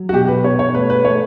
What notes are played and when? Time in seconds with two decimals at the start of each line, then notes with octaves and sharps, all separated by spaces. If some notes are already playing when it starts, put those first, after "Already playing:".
Already playing: F#3
0.09 F#4
0.13 B2 G4
0.28 B4
0.44 B2 C#5
0.59 C#5
0.75 A3 B4
0.90 B4
1.05 A3 C#5